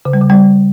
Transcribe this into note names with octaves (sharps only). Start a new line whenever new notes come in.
C#3
G3
C#3
G3